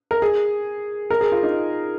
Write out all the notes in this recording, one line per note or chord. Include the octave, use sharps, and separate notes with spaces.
A#4
G#4
A#4
G#4
F4
D#4